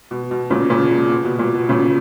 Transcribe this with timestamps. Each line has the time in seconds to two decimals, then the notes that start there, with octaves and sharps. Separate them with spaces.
0.11 B2
0.31 B2
0.50 A#2 C#3
0.70 A#2 C#3
0.91 B2
1.10 B2
1.25 B2
1.39 A#2
1.54 B2
1.69 A#2 C#3